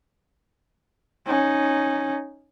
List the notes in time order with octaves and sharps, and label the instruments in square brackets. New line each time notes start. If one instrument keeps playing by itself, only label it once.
[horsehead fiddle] C#4 D#4